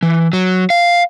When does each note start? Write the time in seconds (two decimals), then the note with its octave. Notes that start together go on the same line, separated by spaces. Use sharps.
0.03 E3
0.33 F#3
0.70 F5